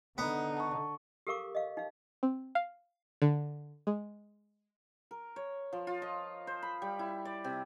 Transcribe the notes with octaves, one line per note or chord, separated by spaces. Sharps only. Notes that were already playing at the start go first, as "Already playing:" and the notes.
D3 B3 D#4
A5 C#6
G4 A4 A#4 F5 C#6 D6
D#5 F5
D#4 F5
C4
F5
D3
G#3
A#4
C#5
F3
F4
D#5
C5
B5
G3
E4
D5
C3